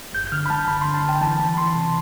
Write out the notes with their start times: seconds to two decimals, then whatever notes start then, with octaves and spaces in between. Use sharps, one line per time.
0.13 G1 G6
0.27 G6
0.32 D3 F6
0.46 B5
0.50 D3 A5
0.68 G1 B5
0.81 D3 C6
0.94 A5
1.04 G1 G5
1.21 E3 A5
1.39 E3 B5
1.57 E3 C6
1.75 C3